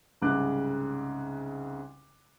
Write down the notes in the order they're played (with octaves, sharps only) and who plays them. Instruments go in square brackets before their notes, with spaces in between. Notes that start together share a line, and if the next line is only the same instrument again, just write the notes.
[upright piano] C2 G#2 C#3 D6 F#6